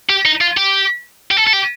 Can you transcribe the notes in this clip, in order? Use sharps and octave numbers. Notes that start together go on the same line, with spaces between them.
G4
D#4
F4
G4
G4
A4
A4
G4